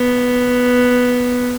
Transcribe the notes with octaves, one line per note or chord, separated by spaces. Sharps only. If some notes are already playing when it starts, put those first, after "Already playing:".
Already playing: B3